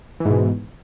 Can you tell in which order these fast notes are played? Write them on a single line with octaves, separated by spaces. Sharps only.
E3 G#2 B2